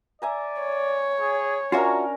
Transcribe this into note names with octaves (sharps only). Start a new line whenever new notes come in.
D5 E5 G#5 A#5
C#5
G#4
C#4 D4 F4 F#4 A#4 E5 A#5